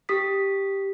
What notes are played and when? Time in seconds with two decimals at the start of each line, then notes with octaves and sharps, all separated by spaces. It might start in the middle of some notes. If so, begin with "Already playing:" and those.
0.09 G4 D#6 B6